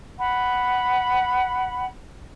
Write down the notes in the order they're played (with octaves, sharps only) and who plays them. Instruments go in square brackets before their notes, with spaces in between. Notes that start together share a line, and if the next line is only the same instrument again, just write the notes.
[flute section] F#5 B5